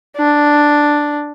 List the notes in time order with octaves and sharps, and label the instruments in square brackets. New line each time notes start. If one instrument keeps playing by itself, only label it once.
[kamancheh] D4